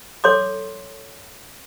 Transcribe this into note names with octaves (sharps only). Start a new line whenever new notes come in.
A4 C#5 C6 D6